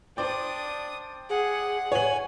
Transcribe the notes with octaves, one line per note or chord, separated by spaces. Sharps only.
D4 C5 D5 G5 D#6
G#4 F#5
C#5 G#5 F#7